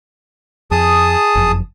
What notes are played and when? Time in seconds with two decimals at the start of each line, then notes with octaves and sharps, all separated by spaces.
0.71 F2 G#4 A5 D#6
1.35 F#1 F2